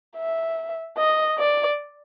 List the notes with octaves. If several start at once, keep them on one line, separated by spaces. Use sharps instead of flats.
E5
D#5
D5